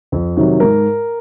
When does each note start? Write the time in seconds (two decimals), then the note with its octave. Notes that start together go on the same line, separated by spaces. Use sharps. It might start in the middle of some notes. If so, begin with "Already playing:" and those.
0.12 F2
0.37 C3 D#3 F#3
0.60 G#2 A#4